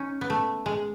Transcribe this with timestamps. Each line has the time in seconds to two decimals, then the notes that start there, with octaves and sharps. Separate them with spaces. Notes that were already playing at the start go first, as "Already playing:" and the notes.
Already playing: C#4 D#4
0.21 B3
0.30 A3
0.66 G#3